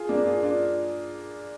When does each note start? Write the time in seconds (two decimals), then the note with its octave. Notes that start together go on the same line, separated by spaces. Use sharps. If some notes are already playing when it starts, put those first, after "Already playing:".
Already playing: F4 G#4
0.09 A#3 D4
0.26 F4 G#4
0.43 D4 F4